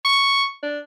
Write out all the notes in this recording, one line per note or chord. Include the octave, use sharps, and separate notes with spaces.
C#6
D4